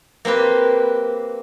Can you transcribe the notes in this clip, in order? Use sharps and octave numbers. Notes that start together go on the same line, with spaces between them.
A#3 C4 G4 B4